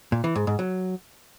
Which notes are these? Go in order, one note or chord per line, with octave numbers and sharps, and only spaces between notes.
A#2
E3
G#2
G#2
F#3